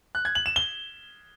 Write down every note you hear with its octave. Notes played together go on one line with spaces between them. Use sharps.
F#6
G#6
F#7
E7
G7